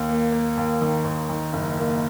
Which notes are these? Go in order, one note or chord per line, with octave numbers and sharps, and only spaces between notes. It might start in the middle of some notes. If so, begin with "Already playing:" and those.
Already playing: D#2
A#3
A#3
D#2
D#3
D#2
D#3
F#1
A#3